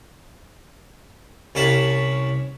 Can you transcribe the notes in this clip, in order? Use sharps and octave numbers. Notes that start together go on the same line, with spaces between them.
C2 C#4 F5 A5 B5